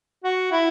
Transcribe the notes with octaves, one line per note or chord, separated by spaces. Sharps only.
F#4
E4